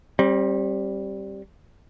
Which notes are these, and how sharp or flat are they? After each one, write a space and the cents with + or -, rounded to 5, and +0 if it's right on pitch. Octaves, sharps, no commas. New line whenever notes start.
G3 +0 C4 +40